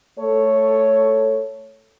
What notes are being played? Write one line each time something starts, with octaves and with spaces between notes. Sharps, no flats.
A3 A4 C#5